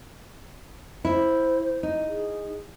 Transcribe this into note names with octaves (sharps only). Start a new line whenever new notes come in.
E4 C5
D#4
G#4